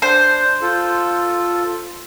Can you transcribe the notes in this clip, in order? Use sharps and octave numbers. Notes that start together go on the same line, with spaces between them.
D4 C5
F4 A4